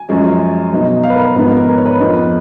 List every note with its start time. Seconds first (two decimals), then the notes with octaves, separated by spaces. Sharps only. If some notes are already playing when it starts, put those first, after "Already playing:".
Already playing: G#5
0.09 F#2 F3 G#3 C#4
0.72 B2 F#3 B3 D#4
1.03 F5
1.10 B4
1.15 A#4
1.25 B4
1.36 G#2 F3 B3 D#4 B4
1.46 A#4
1.57 A#4
1.68 B4
1.77 C#5
1.86 B4
1.99 F2 F3 B3 D#4